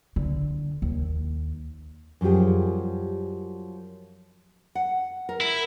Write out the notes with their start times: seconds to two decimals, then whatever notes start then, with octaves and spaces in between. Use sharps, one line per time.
0.16 D3
0.82 D#2
2.21 F#2 F3 G3 G4 G#4
4.75 F#5
5.29 A#4
5.40 E4